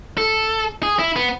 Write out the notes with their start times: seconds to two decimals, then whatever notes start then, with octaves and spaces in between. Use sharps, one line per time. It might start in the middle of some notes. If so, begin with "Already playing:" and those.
0.18 A4
0.83 G#4
0.99 E4
1.16 B3